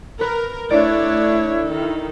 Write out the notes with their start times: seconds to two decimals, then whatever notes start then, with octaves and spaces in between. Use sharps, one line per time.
0.21 A#4 B4
0.70 A3 D4 E4 C#5 D5
1.66 D#3 A4